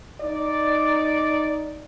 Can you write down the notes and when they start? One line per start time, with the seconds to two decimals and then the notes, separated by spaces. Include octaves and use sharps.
0.21 D#4 D5